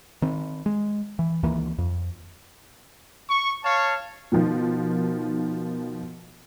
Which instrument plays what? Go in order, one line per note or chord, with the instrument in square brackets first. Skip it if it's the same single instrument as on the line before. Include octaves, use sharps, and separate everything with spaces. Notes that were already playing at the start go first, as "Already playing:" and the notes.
[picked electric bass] D#3 C4
G#3
E3
C#2 D#3 E3 A#3
F2
[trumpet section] C#6
C#5 F5 A5 C#6
[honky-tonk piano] B2 D#3 F3